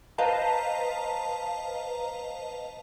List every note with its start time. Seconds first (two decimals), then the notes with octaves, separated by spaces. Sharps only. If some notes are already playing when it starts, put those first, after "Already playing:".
0.18 B4 C5 D#5 F5 A5 A#5